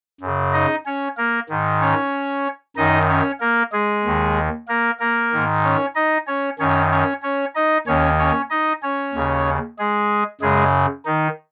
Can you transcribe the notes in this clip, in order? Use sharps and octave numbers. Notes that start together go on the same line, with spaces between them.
F#2
C#3
D#4 D#5
C#4 C#5
A#3 A#4
G#2 D#3
C#4 C#5
F#2 D#3 D#4 D#5
C#4 C#5
A#3 A#4
G#3 G#4
D#2 D#3
A#3 A#4
A#3 A#4
G#2 D#3
C#4 C#5
D#4 D#5
C#4 C#5
F#2 D#3 C#4 C#5
C#4 C#5
C#4 C#5
D#4 D#5
D#2 D#3 C#4 C#5
C#4 C#5
D#4 D#5
C#4 C#5
D#2 C#3
G#3 G#4
F#2 C#3 G#3 G#4
D#3 D#4